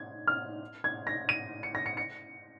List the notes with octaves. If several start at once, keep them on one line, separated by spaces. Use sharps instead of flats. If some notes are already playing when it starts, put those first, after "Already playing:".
Already playing: G#6
F6
G#6
A#6
D#7
C#7
A#6
C#7
C#7